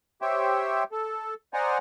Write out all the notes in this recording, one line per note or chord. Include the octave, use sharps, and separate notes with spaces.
G4 C5 C#5 E5 G5
A4
C5 D5 D#5 F#5 G#5 A#5